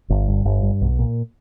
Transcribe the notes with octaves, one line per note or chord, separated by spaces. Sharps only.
G1
G2
G1
G2
B1
A#2